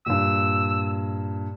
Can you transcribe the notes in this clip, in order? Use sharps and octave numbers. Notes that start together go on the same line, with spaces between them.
G2 A#2 E6